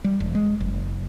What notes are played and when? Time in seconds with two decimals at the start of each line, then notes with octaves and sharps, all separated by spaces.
0.04 G3
0.20 E1
0.35 G#3
0.60 F#1